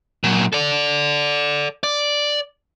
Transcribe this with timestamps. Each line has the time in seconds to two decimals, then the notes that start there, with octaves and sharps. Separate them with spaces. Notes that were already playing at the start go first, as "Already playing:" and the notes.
0.24 A#2 F#3
0.53 A4 D5
1.83 D5